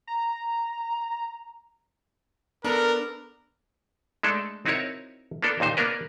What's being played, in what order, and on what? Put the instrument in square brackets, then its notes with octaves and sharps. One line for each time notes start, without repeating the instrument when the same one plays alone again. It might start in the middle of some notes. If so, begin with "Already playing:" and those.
[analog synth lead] A#5
[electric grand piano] B3 D4 A4 [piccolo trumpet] A#4
[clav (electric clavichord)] G#3 A3 D4 A4
C4 D#4 E4 F#4 A#4 C#5
A#3 B3 D4 A4 A#4
D#2 A#2 D#4 C5
A#3 B3 D4 A#4 B4